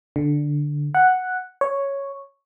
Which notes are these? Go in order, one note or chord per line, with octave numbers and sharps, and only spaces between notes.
D3
F#5
C#5